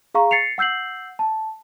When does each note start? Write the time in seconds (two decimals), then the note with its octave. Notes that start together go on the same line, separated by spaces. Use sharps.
0.14 G#4 F5 A#5 C#6
0.31 A6 C7 C#7 F7
0.58 F#5 E6 G6 C7 F#7
1.19 A5